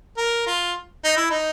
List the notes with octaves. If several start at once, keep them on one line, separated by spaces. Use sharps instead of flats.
A#4
F4
D#4
E4
D#4